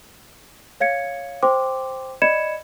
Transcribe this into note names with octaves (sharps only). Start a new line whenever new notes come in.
C#5 F5 G#6 C#7
C5 G5 C6 D6
D5 D#5 B5 G#6 C#7 E7